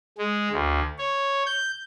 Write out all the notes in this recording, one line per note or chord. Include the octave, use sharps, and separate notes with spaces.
G#3
D2
C#5
G6